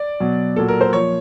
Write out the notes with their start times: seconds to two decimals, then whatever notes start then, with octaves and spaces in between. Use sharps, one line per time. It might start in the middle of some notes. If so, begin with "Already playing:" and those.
Already playing: D5
0.20 B2 F#3
0.56 A#2 F#3 A4
0.68 A#4
0.81 C5
0.93 A#2 F3 C#5